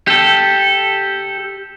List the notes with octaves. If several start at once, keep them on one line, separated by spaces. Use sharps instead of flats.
G4 A4